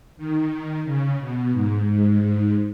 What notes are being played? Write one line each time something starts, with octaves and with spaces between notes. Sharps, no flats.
D#3
C#3
B2
G#2
G#2
G#2